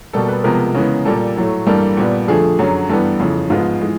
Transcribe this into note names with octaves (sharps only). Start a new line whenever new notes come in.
B2 G3 A#3 A4
B4
C3 F3 G#3 B3 A#4
C#3 E3 G#3 B3
A#2 G3 A#3 A4
A2 F#3 A3
G2 E3 G3 A#3 A4
A#2 G3 B3
F2 D3 F3 A3 G#4
F#2 D3 F#3
G2 E3 G3 B3 A4
F2 C#3 E3
G#2 F3 G#3 B3 F4
E3 G#3